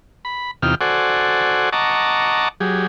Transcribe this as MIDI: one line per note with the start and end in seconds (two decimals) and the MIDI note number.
0.25 0.51 83
0.62 0.75 40
0.62 0.75 48
0.62 0.75 63
0.62 0.75 65
0.62 0.75 79
0.62 0.75 89
0.81 1.70 66
0.81 1.70 69
0.81 1.70 72
0.81 1.70 74
0.81 1.70 78
0.81 1.70 80
1.73 2.48 75
1.73 2.48 78
1.73 2.48 81
1.73 2.48 82
1.73 2.48 85
1.73 2.48 86
2.60 2.87 54
2.60 2.87 67
2.60 2.87 68